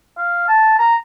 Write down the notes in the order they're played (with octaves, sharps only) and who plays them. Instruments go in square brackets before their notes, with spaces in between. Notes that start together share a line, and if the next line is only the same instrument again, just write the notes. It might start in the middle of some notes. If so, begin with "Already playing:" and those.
[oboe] F5
A5
A#5